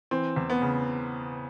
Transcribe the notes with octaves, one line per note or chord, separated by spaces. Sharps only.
E3 C4
E2
B3
C#3